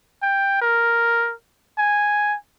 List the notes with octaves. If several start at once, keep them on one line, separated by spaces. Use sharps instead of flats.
G5
A#4
G#5